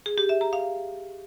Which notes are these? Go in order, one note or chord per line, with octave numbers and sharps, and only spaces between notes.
G#4
G4
E5
A#5
F5